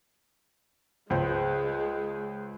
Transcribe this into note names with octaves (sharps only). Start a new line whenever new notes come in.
C#2 G#3 C5